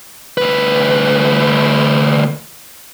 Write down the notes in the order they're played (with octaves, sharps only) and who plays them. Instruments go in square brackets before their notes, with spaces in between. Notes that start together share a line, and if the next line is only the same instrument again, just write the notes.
[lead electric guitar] D2 B4